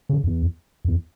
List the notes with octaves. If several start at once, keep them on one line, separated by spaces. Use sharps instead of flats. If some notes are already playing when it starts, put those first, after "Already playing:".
C#3
E2
E2